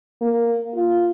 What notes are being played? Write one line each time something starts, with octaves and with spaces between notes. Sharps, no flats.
A#3
F4